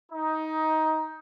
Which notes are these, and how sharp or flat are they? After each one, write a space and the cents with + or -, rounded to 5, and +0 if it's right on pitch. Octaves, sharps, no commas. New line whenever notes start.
D#4 +15